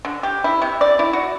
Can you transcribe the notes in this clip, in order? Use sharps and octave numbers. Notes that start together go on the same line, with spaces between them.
D3
G4
E4
C3
D5
E4
F#4